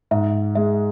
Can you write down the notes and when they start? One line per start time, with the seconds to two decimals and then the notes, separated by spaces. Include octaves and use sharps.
0.11 G#2 E5
0.56 G#3 E5